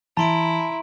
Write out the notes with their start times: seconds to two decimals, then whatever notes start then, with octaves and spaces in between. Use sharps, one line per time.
0.17 E3 E4 A5 A#5 C6 D7